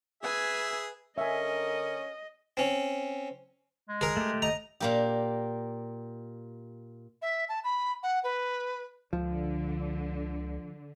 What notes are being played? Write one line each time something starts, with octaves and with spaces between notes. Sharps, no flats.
G#4 B4 E5 G#5
D3 C#4 A#4 D#5 E5 G#5
C4 C#4
G#3
G#4 A#4
A3 G4
D#5 A#5
A#2 A#3 G4
E5
A5
B5
F#5
B4
C#2 D3 F3